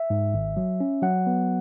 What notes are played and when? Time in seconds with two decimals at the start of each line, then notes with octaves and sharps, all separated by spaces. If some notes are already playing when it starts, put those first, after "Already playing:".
Already playing: E5
0.10 G#2
0.34 G#1
0.57 F#3
0.80 C#4
1.02 F#3 F#5
1.27 B3